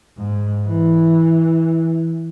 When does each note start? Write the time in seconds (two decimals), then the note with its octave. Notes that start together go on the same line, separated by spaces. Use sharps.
0.17 G#2
0.67 E3